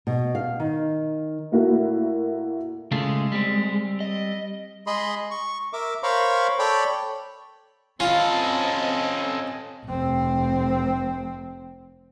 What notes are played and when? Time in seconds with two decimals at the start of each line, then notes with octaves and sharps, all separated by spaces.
0.07 B2
0.35 F5
0.60 D#3
1.51 A#2 A3 A#3 E4 F#4 A#4
2.92 C#3 G#3 A3 F4
3.32 G3 C4
4.00 D#5
4.87 G#3 G#4 D#5 B5 C6
5.31 C#6
5.73 A#4 E5 D6
6.03 A#4 C5 C#5 F5 B5 C#6
6.59 A4 C#5 D5 G5 B5
8.00 C4 C#4 F4 A4 D#5
9.86 F1 C4